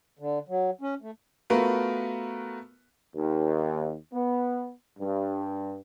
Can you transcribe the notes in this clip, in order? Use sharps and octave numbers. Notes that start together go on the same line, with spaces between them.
D3
F#3
C#4
A3
A3 B3 F4 F#4 A#4 B4
D#2
B3
G2